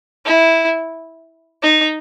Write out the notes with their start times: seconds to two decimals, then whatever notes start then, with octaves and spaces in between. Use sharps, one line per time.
0.25 E4
1.62 D#4